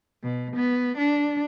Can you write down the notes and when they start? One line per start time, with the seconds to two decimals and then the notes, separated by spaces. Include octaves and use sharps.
0.23 B2
0.56 B3
0.98 D4